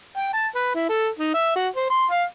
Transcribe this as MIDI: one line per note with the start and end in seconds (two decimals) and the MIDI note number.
0.17 0.29 79
0.33 0.47 81
0.55 0.73 71
0.75 0.86 64
0.89 1.08 69
1.19 1.30 63
1.34 1.55 76
1.55 1.68 66
1.76 1.88 72
1.90 2.06 84
2.11 2.24 77